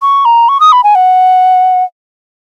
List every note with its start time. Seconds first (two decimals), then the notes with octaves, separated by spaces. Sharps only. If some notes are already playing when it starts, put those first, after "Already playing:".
0.02 C#6
0.25 A#5
0.49 C#6
0.60 D#6
0.72 B5
0.84 G#5
0.95 F#5